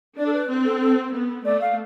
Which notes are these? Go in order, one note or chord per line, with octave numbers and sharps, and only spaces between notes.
D4 D5
A4
B4
C4
A4
A4
B3
A3 D5
F5